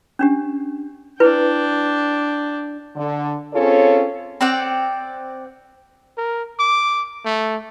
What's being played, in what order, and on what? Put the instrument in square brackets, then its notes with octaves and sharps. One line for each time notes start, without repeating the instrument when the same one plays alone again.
[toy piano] C#4 D4 G4
[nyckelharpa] D4 G5 [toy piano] E4 B4
[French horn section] D3
C4 C#4 F4 G#4 A4 C#5
[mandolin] C4 D5 F#5 G5
[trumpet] A#4
D6
A3